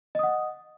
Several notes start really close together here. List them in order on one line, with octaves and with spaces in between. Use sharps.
D#5 D#6 F#5